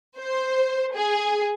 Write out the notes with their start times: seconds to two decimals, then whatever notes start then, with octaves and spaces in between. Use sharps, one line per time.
0.18 C5
0.94 G#4